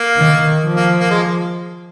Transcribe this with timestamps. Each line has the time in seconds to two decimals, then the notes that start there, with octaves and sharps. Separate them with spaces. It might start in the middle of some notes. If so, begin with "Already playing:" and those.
Already playing: A#3
0.18 D#3
0.64 F3
0.76 A#3
1.00 A#3
1.10 G#3